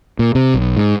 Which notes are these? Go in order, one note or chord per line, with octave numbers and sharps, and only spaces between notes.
A#2
C3
B1
G#2